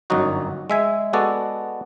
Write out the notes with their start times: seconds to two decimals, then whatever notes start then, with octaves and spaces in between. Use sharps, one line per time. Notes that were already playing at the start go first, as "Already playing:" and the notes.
0.10 G1 F#2 F#3 D#4 F#4
0.70 G#3 E5 G#5
1.13 G#3 B3 F#4 A4 D5